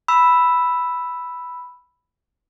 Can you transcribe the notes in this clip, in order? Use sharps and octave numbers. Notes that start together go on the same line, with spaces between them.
B5 E6